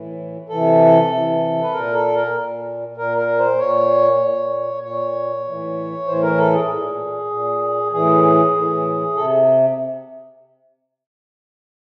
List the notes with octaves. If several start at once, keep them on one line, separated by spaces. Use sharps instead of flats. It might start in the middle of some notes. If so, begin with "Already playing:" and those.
Already playing: A2 E3
C3 E3 A4
C3 E3
B4
A#2 A#4
A4
A#4
A#2
A#2 A#4
A#4
C5
A#2 C#5
A#2
A#2 C#5
A2 E3
A2 E3 C5
A#4
A4
G#4
A#2
A#2
A2 E3 G#4
A2 E3
C3 A4